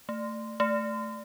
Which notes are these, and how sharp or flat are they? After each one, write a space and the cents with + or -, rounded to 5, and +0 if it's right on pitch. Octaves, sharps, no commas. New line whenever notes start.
A3 +20
A3 +0